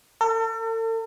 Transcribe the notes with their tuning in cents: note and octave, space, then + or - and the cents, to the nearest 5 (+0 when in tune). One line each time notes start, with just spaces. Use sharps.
A4 +45